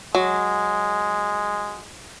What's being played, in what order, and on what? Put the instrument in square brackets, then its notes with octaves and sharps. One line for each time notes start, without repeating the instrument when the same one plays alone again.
[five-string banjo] F#3 [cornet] G#3